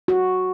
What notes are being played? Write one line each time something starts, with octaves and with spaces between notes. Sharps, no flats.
F#4